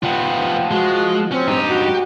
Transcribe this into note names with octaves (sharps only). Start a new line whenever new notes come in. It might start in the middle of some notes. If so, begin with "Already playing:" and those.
F3 B3 F4 F#5 G5
G#3 F#4
C4 C#4
G2 D#4 G4
F#4